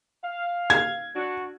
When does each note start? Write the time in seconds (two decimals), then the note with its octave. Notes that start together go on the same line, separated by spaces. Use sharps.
0.24 F5
0.70 G#6
1.15 D4 F#4